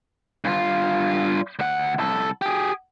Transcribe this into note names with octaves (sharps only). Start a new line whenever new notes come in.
G2 F4
D2 F#5
C2 A4
G4 G#4